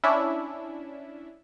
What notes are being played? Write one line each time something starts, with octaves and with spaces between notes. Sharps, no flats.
C#4 D4 E4 E5